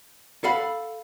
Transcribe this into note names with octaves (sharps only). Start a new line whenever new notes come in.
A4 F5 F#5 B5